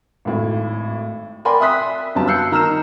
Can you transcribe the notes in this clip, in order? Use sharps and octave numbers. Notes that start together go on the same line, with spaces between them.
G#1 A2
A#4 D5 G5 G#5 B5 C6
E5 C6 D#6 F#6 B6
G1 F#2 G3 A5
E6 F#6 G6 C7 C#7
D#3 A#5 E6 F6 E7